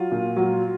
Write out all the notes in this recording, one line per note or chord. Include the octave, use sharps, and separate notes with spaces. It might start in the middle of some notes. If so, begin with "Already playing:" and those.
Already playing: F#3 F4
A#2
F#3